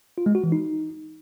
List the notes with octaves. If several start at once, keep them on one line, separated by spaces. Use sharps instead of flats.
F4
G#3
F#4
E3
D#4